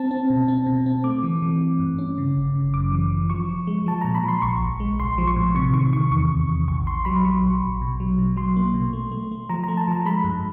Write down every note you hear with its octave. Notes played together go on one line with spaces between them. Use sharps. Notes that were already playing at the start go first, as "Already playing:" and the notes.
Already playing: C4 A5
C4
B2
C4
B2
C4
A3 D6
E3
E3
E3
G2
C#4
C#3
G1
C#3
F#2 D6
E3
E3
F3 C#6
F3
G#3
F3 A5
A#2 A#5
B5
F3 C6
A#1 C#6
A#1
G#3
A#1 C6
F3
C#6
A2
C3 C#6
D#3 C#6
D#3 C#6
E2 C#6
E2
E2
A#1 C#6
A#1 C6
F#3 B5
F#3 C#6
A#1
A#1
B2
F#3
B2
F#3 C6
A#3
B2
A3
A3
A3
F3 A#5
A3 A#5
A5
F3 A#5
G#3 B5
G2